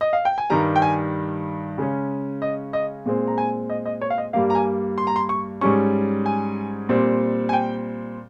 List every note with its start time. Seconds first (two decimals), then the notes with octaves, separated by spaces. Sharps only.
0.01 D#5
0.13 F5
0.25 G5
0.38 G#5
0.50 G2 D#3 G3 A#5
0.76 G5
0.82 G#5
1.78 C#3 G#3 C#4
2.42 D#5
2.73 D#5
3.06 A#2 G#3 C4
3.27 A#5
3.38 G#5
3.70 D#5
3.86 D#5
4.01 C#5
4.10 F5
4.18 D#5
4.33 G2 G3 A#3 F5
4.50 A#5
4.55 G#5
4.98 C6
5.07 A#5
5.16 C6
5.29 C#6
5.61 G#2 G3 C#4 C#6
6.26 G#5
6.89 A#2 G3 C4
7.49 G#5
7.53 G5